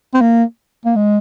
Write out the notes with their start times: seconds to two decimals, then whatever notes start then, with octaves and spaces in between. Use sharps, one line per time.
0.14 C4
0.21 A#3
0.86 A#3
0.96 G#3